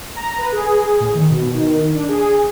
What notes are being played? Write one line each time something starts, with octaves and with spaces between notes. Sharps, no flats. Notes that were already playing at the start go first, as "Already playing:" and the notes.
A#5
B4
G#4
A2
D#3
B2
D#3
D4
G#4